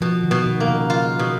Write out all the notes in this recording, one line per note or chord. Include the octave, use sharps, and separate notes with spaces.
B2 F3
D#3
B2
D#3
A#3
C#3
F4
B2